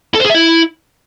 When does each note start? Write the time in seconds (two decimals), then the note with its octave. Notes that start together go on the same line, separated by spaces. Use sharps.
0.15 A4
0.20 C5
0.25 G#4
0.30 E5
0.35 E4